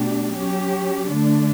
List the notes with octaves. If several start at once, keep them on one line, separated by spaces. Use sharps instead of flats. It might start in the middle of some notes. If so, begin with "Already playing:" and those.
Already playing: B2 A3 D4 G4
F#3 C#4 G4
D3 A3 D4